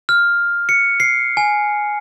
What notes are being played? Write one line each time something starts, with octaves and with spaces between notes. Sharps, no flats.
F6
C#7
C7
G#5